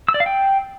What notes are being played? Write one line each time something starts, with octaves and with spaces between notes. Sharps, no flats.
E6
D5
F5
G5